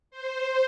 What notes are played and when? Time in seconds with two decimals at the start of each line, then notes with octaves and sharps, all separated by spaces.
0.11 C5